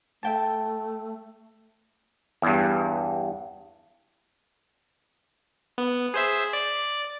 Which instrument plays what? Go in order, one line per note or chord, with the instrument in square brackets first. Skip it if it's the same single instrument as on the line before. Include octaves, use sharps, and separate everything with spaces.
[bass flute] A3 [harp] E5 G5 A5
[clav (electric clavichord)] E2 G2
[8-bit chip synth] B3
G#4 C5 E5
D5